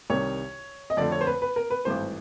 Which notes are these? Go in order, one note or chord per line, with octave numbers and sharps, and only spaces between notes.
C2 C3 D#3 G3 C#5
D#5
F2 D3 F3 A3 D5
C#5
C5
B4
B4
A#4
B4
G#1 G2 E3 A3 C5